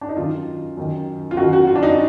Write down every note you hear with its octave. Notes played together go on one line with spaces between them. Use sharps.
D4
D#4
F#2 D#3 F4
F#2 D#3
F4
F#2 D#3 F#4
F#4
F4
D4
D#4